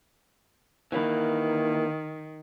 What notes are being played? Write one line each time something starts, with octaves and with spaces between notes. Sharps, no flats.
D#3 E3 A#3 B4